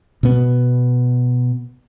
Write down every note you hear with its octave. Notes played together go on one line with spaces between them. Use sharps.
B2 B3